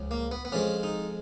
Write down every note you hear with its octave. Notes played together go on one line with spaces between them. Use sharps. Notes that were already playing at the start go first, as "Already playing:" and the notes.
Already playing: C#2 C#3 F3
A#3
B3
B3
F2 F3 G#3 C#4
D#4